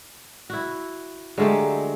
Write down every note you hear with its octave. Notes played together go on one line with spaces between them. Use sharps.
E4 F#4
D3 F#3 G#3 A3 G4